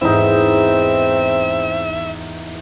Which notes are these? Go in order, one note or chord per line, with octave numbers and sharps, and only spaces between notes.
E2 G#2 C4 D#4 E4 E5